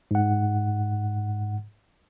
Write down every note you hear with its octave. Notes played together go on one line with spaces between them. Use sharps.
G#2 F#5